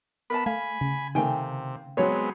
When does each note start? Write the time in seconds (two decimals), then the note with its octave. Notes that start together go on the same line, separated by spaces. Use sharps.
0.30 B3 A#4 E5 A5 B5
0.46 A3 F5 G#5 B5
0.81 C#3
1.15 C3 D#3 A3 F5 G5 G#5
1.97 F#3 G#3 B3 C4 C#5